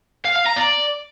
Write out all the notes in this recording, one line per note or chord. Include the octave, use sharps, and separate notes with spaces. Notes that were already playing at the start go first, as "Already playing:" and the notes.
F5
F5
A#5
D5